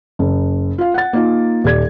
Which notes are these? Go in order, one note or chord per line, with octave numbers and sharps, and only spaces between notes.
F#1
F4 F5
F#5 A6
A#3 D#4 F4
D#1 G4 D5 G#6